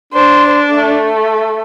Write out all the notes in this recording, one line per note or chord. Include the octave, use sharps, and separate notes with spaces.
D4 C5
A3